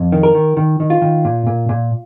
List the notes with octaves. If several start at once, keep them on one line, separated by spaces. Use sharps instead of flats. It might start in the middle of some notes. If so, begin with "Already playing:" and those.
Already playing: F2
D#3
A#4
D#3
D#3
D#3
F4
D#3
A#2
A#2
A#2